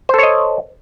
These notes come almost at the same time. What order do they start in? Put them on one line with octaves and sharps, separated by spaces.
C5 A4 C#5 D#5